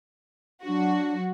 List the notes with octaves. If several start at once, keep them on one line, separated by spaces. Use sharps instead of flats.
F#3 D4 F#4